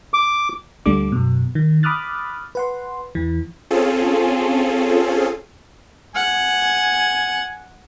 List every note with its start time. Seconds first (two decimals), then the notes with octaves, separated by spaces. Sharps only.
0.14 D6
0.86 D2 G3 A3 D4 D6
1.12 F#2 B2
1.55 D#3
1.83 B5 D6 D#6 F6 F#6 A6
2.55 B4 F#5 C6
3.15 E2 E3
3.71 C4 C#4 F4 G#4 A4
6.15 F#5 G#5